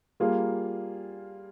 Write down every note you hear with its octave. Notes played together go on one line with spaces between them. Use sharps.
G3 A#3 F4 G#4